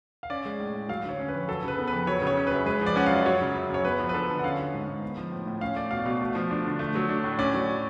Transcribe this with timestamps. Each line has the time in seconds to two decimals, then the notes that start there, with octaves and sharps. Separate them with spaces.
0.23 F5
0.30 C#4 D5
0.45 G#3
0.60 A2
0.75 A2
0.89 F#3 F5
1.04 D3
1.09 C#5
1.19 C#4
1.28 B4
1.34 F2
1.48 F#3 A4
1.63 C#3 B4
1.78 B3
1.88 B4
1.93 F2
2.07 F#3 C#5
2.22 C#3
2.27 C#5
2.37 C#4
2.47 F#2 B4
2.66 G#3 B4
2.81 F3
2.86 D5
2.96 C#4 F#5
3.06 F#2 F5
3.25 F#3 C#5
3.41 C#3
3.55 F#2
3.70 F#2 C#5
3.84 B3 B4
3.99 F3
4.09 B4
4.14 D4 A4
4.29 D3
4.39 F#5
4.44 C#4 F5
4.58 F#3
4.73 G#2
4.88 G#2
5.02 B3
5.17 F3
5.32 A2
5.47 A2
5.61 C#4 F5
5.76 A3 D5
5.91 B2 F5
5.99 D5
6.05 B2 F5
6.21 A3
6.35 F3
6.51 D4
6.65 D3
6.79 A3
6.95 F#3
7.09 D4
7.24 A2
7.39 C#4 D5
7.54 F#3